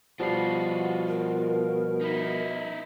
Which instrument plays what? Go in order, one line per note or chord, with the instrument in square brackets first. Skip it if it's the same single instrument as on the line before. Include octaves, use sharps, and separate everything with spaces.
[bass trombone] B2 [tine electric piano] F3 G3 C7 [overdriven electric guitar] F4 F#4
[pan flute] A#4
[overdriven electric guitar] D#4 E4